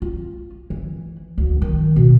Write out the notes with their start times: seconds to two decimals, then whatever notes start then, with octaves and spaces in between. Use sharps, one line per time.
0.02 F4
0.70 E3
1.38 D2
1.62 D#3
1.96 B2